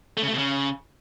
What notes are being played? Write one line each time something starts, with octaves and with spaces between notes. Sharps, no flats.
A3
C#3
A3
B2
C#3